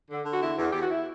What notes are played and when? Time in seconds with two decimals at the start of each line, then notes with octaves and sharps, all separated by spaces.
0.09 D3
0.25 D3
0.32 F#4
0.42 E2 E4
0.58 E2
0.70 E2 G4
0.80 F#4
0.91 E4